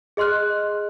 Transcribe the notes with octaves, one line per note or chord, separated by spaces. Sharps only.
G#4 D#5 C6 F6 F#6